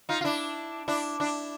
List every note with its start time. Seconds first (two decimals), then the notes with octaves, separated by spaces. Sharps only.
0.09 D#4 F4
0.21 F4
0.24 D4 E4
0.88 D4 E4
1.20 D4 E4